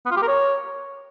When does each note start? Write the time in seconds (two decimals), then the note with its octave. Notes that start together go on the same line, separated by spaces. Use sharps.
0.06 B3
0.11 F4
0.17 G4
0.22 A#4
0.28 C#5